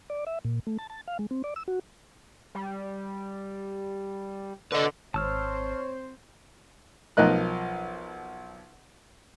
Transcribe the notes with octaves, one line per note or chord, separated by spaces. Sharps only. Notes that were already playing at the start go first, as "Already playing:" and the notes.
D5
E5
A#2
A3
A5
A5
F5
G#3
C4
D5
E6
F#4
G3
D3 B4 D#5
G#1 C4 C5 C#5 A5 E6 F6
B1 F3 A#4 D#5 F#6